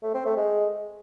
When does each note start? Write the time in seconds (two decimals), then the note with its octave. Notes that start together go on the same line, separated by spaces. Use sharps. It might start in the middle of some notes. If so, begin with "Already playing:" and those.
0.03 A3
0.14 C4
0.25 A3
0.37 G#3